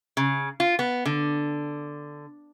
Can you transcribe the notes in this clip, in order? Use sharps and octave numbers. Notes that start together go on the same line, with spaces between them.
C#3
F4
B3
D3